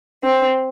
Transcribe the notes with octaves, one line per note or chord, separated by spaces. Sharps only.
C4